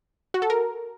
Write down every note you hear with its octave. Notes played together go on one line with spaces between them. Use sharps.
F#4
A4
A#4